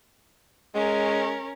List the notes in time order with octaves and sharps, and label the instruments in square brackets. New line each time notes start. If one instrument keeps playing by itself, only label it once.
[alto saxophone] G#3 [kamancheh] C#4 A#4